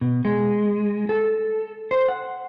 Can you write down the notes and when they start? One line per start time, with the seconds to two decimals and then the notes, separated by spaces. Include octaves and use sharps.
0.01 B2
0.25 G#3
1.09 A4
1.91 C5
2.08 F#5